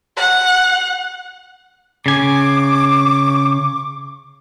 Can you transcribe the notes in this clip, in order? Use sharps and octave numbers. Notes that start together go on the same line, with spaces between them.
F#5
C#3 G#5 C#6 D6